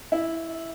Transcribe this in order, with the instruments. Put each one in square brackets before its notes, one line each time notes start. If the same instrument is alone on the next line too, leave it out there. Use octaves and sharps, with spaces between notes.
[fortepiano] E4